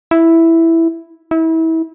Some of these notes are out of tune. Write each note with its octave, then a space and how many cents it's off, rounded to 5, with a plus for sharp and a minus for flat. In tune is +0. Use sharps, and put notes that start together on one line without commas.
E4 +0
E4 -30